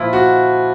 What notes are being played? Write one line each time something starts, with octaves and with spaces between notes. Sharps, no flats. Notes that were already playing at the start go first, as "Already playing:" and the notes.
Already playing: A#2 F3 E4 F4
F#4